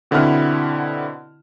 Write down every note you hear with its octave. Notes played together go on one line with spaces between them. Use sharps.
B2 D3 C4 E4 F#5 F6